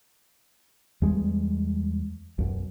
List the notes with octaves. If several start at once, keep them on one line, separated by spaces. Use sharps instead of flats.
E2 G3 G#3
B1 F#2